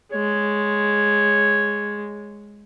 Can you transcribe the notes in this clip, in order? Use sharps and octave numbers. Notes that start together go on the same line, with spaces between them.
G#3 C#5